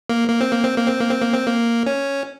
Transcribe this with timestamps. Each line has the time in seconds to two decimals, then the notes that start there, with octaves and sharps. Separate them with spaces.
0.09 A#3
0.29 A#3
0.41 C4
0.53 A#3
0.64 C4
0.76 A#3
0.88 C4
0.99 A#3
1.11 C4
1.22 A#3
1.34 C4
1.46 A#3
1.86 C#4